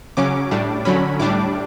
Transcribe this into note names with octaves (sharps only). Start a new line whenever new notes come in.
C#3 F#3 C#4 D6
A2 G3 D4
D3 F#3 C#4 B5
A2 G3 D4 D6